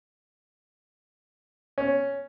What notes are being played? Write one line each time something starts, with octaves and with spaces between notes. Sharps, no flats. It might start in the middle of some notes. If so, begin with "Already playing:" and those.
C#4